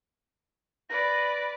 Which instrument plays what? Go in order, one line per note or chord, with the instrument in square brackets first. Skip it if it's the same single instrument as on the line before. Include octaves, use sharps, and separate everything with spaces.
[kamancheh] B4 D5 [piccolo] A#6